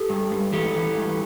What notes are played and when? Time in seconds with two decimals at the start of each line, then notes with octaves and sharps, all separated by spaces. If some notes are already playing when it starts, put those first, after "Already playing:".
Already playing: G4 A4
0.09 G2
0.31 G2
0.53 E3 G4 A4
0.76 E3
0.98 G2